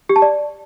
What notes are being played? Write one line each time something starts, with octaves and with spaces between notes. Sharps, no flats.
G4
A5
D5